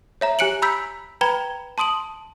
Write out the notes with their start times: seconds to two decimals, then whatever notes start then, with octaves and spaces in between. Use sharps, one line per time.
0.21 C#5 E5 A#5
0.39 G4 G#5 F#6 C#7 D7 F#7
0.62 A#5 B5 E6 G6 B6
1.21 B4 G5 A#5 B5 G#6 G7
1.78 A5 C6 D#6 D7 F#7